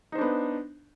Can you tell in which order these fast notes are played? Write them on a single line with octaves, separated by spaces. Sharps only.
D#4 C5 D4 B3